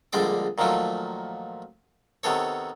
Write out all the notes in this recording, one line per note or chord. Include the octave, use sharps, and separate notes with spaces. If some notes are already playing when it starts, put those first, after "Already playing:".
A#1 D3 G3 G#3 D5 D6
A#2 D#3 F3 F#3 A3
C3 D#3 B3 A4 C#5